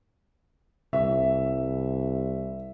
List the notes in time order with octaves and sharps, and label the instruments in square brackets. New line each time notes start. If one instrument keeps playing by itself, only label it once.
[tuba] C2 [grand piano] E5